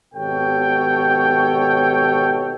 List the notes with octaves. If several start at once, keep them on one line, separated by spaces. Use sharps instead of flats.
G#1 B2 G4 A4 C#5 G5